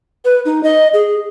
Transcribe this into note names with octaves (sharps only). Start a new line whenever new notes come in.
B4
D#4
D#5
G#4